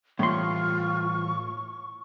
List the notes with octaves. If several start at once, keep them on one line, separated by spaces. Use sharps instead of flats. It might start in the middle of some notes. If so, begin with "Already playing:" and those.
A2 E3 G3 F4 C6 C#6